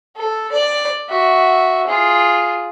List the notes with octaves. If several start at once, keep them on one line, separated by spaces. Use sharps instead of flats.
A4
D5
F#4 E5
F4 G#4